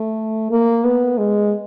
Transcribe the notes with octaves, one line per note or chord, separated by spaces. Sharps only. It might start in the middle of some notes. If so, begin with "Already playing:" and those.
Already playing: A3
A#3
B3
G#3